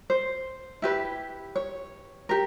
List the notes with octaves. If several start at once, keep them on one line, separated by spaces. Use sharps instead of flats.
C5
E4 G4 B4
C#5
G4 A#4